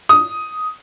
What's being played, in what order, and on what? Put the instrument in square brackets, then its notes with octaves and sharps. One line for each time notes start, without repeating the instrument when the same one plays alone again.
[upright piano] D#6